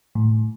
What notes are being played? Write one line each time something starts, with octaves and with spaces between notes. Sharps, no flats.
A2